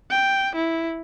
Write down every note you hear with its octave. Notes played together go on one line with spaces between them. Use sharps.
G5
E4